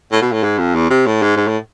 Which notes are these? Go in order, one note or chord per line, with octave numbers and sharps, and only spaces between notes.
A2
B2
A2
G#2
F2
E2
C3
A2
G#2
G#2
A2